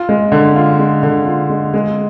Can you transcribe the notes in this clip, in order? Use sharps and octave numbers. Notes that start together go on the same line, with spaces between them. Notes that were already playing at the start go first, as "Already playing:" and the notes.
Already playing: F4
G#3
D3
F4
G#3
D3
F4
G#3
G#3